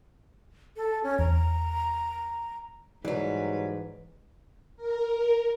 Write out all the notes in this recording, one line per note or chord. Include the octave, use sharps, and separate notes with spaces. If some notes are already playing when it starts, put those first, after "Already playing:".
A4
C#4
E2 A#5
G#2 E3 F#3 G3 B4
A#4